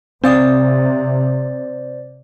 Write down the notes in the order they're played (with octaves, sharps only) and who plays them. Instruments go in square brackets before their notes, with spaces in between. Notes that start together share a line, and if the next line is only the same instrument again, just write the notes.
[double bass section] C3 [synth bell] C4 F5 D#6 [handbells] C5 D5